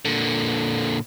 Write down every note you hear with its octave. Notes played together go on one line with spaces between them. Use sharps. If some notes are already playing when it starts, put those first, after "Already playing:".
A#2 D3